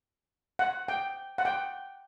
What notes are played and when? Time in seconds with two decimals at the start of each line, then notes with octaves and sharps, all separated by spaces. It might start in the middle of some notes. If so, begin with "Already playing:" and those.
0.59 F#5
0.88 G5
1.38 F#5
1.45 G5